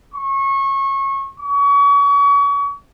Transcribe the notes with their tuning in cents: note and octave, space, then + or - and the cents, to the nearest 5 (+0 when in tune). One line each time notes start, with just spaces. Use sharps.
C#6 -25
C#6 +35